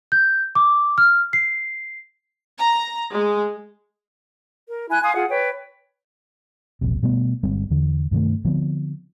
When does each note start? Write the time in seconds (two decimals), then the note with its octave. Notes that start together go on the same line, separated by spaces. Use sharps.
0.12 G6
0.55 D6
0.98 F6
1.33 C7
2.58 A#5
3.12 G#3
4.68 A#4
4.90 E4 G#5 F#6
5.03 F5 G#5 C6 D#6
5.15 F4 G#4 F#5
5.30 B4 C#5 G5
6.81 E1 A#1 C3
7.03 B2 G3 A3 B3
7.43 G1 G3 G#3 C4
7.70 E2 D3
8.11 G2 C3 D#3 A3
8.45 D3 F3 B3 C4